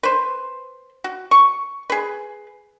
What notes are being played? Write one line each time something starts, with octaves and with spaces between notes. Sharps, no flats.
B4 C5
F#4
C#6
G#4 B4